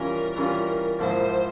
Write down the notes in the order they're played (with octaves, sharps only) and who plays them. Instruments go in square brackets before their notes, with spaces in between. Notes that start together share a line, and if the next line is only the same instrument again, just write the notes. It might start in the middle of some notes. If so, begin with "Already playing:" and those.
Already playing: [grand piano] E3 G3 C#4 F4 [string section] A#4
[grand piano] E3 G3 C#4 F4
[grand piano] G#2 F3 A#3 E4 [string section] C5